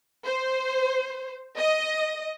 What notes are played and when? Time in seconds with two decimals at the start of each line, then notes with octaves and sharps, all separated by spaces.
0.25 C5
1.57 D#5